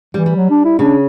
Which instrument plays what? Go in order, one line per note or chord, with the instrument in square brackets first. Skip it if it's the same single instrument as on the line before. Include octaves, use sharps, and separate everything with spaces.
[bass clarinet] E3 [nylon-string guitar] G3
[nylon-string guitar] G3
[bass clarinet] F#3
D4
E4
[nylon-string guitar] C#3 [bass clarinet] D4